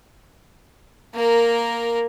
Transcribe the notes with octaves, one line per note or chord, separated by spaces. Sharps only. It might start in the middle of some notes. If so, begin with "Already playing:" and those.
A#3 A#4